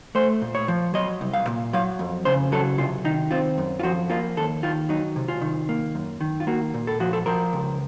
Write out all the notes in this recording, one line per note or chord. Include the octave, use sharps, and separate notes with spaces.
A3 C5
A#2
C#5
F3
F#3 D#5
C2
F5
A#2
F#3 F5
F2
C#3 C5
F#3 A4
C3 F4
D#3 D#4
C4 F4
F#2
F4
F3 F#4
A#3 F4
D#2 A4
D#3 F4
F#3 D#4
C3
F4
D#3
A#3
F#2
D#3
F4
A#3 F#4
A#2
A4
F3 F#4
A4
F3 A#4
C#2